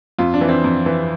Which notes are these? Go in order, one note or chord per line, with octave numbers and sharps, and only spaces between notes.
F2 F4
D4
E3
C4
F2
E3